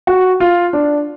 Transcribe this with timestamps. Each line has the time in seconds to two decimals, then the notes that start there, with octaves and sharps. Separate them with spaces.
0.07 F#4
0.40 F4
0.73 D4